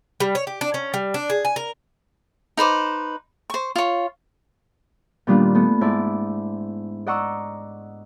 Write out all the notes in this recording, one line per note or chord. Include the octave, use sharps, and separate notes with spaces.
G3
C#5
G4
D4
C#4
G3
D4
G#4
G#5
A#4
D#4 B4 C5 D6
C5 C#6
F4 C#5
A#2 D#3 G3 B3 D4 F4
A3 B3
G#2 E4 D5 A5
D5 D#5 F#5 A#5 C#6 E6